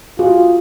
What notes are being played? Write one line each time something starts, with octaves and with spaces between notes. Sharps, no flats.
F4 F#4 G#4